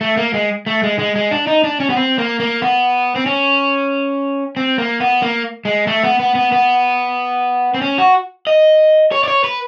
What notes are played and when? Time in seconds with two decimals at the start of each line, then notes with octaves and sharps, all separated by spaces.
0.01 A3
0.17 A#3
0.34 G#3
0.66 A3
0.83 G#3
0.99 G#3
1.15 G#3
1.31 D4
1.47 D#4
1.64 D4
1.80 C#4
1.90 B3
1.97 C4
2.18 A#3
2.40 A#3
2.62 B3
3.16 C4
3.26 C#4
4.57 C4
4.78 A#3
5.00 B3
5.22 A#3
5.65 G#3
5.87 A3
6.04 B3
6.19 B3
6.35 B3
6.52 B3
7.74 C4
7.81 C#4
7.98 F#4
8.47 D#5
9.12 C#5
9.24 D5
9.28 C#5
9.44 B4